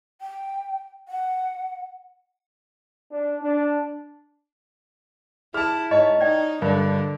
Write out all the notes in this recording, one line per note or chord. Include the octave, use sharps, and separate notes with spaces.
G5
F#5
D4
D4
E4 G#4 A5 F6
G#2 C#5 D#5 A5
D#4 D5 G5
G2 D3 A#4